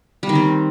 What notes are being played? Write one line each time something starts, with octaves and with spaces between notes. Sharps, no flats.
G3
D#3
C4